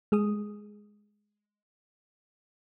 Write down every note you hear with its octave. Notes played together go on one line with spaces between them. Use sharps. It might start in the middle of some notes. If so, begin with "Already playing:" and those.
G#3 G#4 D#6